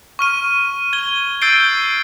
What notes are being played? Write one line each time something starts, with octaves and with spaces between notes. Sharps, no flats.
C#6 F6 D#7
G#6 G7
E6 G6 A6 C7 D7 G7